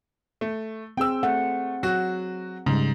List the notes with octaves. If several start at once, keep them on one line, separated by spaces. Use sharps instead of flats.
A3
C4 G#4 C5 G5 E6
A3 F#5
F#3 F#4
G#2 C#3 G3